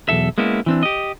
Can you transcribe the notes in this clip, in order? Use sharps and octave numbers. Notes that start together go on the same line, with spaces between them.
B1 E2 A4 E5
G#3 A#3 B3 C#4 E4
E3 C4 D4
G4 D#5